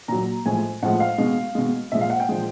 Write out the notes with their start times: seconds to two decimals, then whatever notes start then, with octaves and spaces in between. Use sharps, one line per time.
0.08 A#2 F#3 A#5
0.45 A2 F3 G#3 G#5
0.83 A2 F3 G#3 F#5
1.00 F5
1.18 B2 G#3
1.55 B2 G#3
1.92 A#2 F3 G#3 E5
2.01 F5
2.10 F#5
2.20 G5
2.29 A#2 F3 G#3